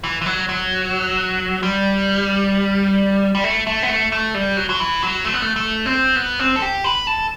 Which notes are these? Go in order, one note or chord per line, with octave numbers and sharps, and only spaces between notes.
E3
E3
F#3
F#3
G3
G3
A3
A3
B3
A3
A3
G3
F#3
F#3
E3
F#3
A3
B3
A3
A3
C4
B3
C4
A4
G4
B4
A4